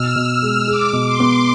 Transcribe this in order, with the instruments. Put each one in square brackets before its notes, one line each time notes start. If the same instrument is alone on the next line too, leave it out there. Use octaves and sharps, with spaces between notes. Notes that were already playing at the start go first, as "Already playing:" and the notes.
Already playing: [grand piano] B2 [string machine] E6 F6
[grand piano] B2
G#3
[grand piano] G#4 [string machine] D6
[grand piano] B2
[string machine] C6
[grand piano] B3